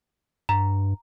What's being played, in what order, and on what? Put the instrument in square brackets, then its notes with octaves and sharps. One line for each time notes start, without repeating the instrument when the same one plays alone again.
[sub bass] G2 [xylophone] A#5